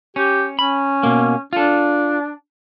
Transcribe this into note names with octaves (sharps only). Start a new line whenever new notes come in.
C#4 G4
C#4 B5
B2 A#3
D4 F4 A4